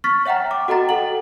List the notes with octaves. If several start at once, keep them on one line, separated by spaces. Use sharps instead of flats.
C#6 F6 A6 B6
C#5 E5 F#5 G5 A#5
D6
F#4 A4 D#5 G5 A#5 A6
A4 F#5 F#7